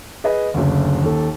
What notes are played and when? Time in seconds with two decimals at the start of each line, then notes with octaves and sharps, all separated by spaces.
0.24 G#4 B4 D#5
0.54 F#1 D2
1.01 D#2 A4